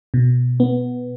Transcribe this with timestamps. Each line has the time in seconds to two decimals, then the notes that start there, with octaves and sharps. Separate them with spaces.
0.14 B2
0.60 B3